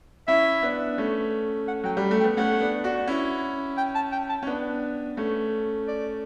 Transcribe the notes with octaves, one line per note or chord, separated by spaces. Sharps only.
C#4 E4 E5
B3 D4
A3 C#4
F#5
F#3 G5
G3
A3
G5
B3
A3 C#4 F#5
B3 D4
D4 F#4
C#4 E4
G5
A5
G5
A5
C#4
B3 D4
A3 C#4
D5